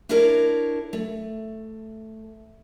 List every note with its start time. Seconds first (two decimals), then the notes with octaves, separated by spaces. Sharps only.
0.09 D4 E4 F#4 A4 A#4 C#5
0.93 A3